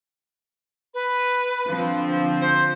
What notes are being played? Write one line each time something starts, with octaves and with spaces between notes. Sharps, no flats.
B4
D3 F3 C4
C5